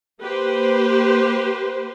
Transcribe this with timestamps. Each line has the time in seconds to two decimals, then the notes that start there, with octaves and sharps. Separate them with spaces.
0.21 A#3 G4 B4 C5